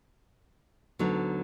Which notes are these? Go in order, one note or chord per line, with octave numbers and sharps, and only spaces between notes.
D2 D3 F#3 B3 D#4